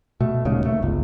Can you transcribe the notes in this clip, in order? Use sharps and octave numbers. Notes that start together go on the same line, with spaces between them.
B2 A3
D#1 D#2 C#3 G#3
D#2 A3
G1 C#2